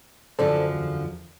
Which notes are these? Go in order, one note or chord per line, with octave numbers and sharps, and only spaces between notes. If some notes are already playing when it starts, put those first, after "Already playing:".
F#2 D3 F3 A4 C5 D5
E2